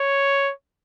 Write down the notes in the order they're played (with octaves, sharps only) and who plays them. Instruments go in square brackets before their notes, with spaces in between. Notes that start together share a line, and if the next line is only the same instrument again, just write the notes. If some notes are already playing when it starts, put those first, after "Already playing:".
Already playing: [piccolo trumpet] C#5